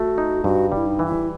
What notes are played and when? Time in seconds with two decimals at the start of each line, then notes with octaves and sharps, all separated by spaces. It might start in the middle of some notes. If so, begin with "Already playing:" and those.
Already playing: A3 F#4
0.18 D#4
0.44 G2 F#4
0.72 G3 E4
0.86 D#4
0.99 E3
1.06 E4